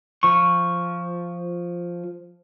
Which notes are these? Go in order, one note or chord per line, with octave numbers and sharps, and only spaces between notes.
F3 C#6